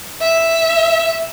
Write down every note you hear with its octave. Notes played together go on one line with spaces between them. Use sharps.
E5